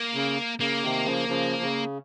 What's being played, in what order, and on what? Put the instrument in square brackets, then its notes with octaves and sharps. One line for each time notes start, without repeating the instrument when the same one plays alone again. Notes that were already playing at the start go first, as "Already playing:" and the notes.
Already playing: [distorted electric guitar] A#3
[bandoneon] C#3
[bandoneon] C#3 [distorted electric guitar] A#3
[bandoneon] C3 D#3
C#3 F3
C#3 F3
C#3